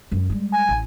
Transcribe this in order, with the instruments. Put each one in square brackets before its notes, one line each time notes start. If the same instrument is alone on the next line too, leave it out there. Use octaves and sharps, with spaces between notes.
[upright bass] F#2 F#3
G3 G#3
[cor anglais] G#5
[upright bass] A1